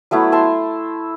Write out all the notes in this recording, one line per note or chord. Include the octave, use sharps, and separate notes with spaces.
F#3 A3 B3 E4
E5 G5 A5 C6